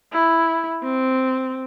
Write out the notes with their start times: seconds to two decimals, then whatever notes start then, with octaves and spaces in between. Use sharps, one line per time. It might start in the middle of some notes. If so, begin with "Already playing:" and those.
0.13 E4
0.83 C4